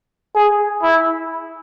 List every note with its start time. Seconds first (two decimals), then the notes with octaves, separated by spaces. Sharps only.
0.35 G#4
0.82 E4